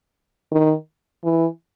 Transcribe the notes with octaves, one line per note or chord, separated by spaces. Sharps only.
D#3
E3